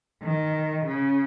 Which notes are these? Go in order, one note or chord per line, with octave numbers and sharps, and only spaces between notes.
D#3
C#3